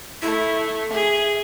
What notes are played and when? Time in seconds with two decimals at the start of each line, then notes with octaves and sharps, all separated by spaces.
0.22 A3 E4
0.92 G#4 E5